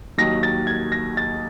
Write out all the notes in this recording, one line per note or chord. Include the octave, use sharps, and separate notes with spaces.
D#2 D#3 F#3 A#6
A6
G#6
A#6
A6